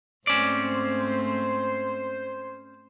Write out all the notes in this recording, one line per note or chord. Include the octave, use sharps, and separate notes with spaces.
G#2 A3 C4 C#4 C5 D5